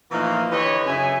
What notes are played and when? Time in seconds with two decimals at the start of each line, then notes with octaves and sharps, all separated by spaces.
0.11 A#2 E3 F3 A3 A#3 D#4
0.50 D3 E3 G4 B4 C#5 D#5
0.86 F#2 C#3 E5 G#5